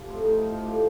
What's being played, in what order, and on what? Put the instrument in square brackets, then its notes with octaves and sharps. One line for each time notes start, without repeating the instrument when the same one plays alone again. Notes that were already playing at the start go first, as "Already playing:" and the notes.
Already playing: [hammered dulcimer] F3 F4 G4
A2 C4
D#4
F3
D#4
F3 F4
A2 G4